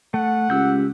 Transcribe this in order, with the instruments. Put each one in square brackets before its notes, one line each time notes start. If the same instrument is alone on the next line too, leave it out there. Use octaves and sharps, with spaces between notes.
[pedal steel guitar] A3 [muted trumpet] F#5
[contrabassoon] C#2 [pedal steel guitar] G4 E6 G6